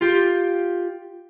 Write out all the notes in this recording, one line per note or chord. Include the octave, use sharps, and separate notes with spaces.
F4 G4